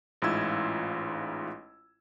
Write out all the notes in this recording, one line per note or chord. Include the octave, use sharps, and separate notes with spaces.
A1 G#2 E4 F4 E6 G#6